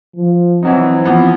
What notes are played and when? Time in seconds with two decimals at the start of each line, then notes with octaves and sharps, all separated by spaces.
0.16 F3
0.63 E3 F#3 C4 D#4
1.05 E3 F3 B3